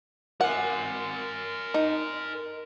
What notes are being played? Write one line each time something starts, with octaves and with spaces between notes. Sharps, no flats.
A#4 F#5 G#5
D#4